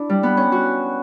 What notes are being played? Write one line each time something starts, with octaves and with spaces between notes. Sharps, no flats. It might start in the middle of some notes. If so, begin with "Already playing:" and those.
Already playing: D4 E4
G3
B3
C#4
F#4